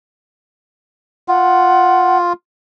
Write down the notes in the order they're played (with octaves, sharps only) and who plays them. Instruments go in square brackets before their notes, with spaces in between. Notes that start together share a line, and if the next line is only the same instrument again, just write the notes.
[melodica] F4 [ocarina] F#5